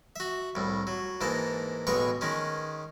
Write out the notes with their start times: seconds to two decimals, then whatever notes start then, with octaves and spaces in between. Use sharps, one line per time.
0.16 F#4 E5
0.55 C2 A2
0.87 F#3
1.21 G#2 E3 A#3 A5
1.87 A1 B2 G#3 C#5 C#6
2.21 D#3 G#3 C#4